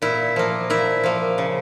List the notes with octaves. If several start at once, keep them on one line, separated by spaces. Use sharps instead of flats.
A#2 E4
F3 A#3
A#2 E4
F3 A#3
C#3